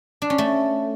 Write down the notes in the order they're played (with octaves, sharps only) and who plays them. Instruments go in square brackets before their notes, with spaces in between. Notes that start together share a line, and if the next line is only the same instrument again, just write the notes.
[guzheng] D4
C#4
A3